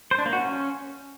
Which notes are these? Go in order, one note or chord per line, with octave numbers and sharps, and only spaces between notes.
C5
D4
A#3
F#4
C#4